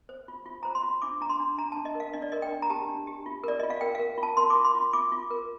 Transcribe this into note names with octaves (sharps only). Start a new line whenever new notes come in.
C5
F4
F4
C5 A#5
C6
F4
D4 D6
D4 A#5
C6
D4
D4 A#5
D4 A5
D#5
A#4 F5
D4 D#5
D5
A#4 D#5
G5
D4
A#5
G4 A5
D4
G4
F4
A#4 D5
F4 D#5
F5
A#4 G5
A#4 F5
F4
A5
A#4 C6
D6
F4
C6
F4
F4 D6
F4
A#4